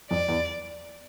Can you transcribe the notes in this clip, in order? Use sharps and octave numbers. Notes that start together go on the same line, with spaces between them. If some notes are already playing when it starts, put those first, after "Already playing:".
F2 D5
E2